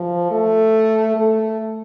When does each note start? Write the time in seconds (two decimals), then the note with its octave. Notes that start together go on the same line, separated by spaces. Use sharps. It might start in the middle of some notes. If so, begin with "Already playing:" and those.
Already playing: F3
0.31 A3
1.16 A3